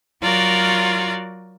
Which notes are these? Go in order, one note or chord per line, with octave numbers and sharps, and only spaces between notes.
F#3 F4 F#4 A#4 C#5 D5